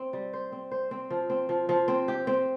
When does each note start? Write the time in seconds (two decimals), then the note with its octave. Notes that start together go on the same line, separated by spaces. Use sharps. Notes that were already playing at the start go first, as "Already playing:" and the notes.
Already playing: C4
0.13 G3
0.33 C5
0.52 C4
0.71 C5
0.91 C4
1.10 F3
1.30 C4
1.49 F3
1.69 F3
1.88 C4
2.08 G4
2.27 C4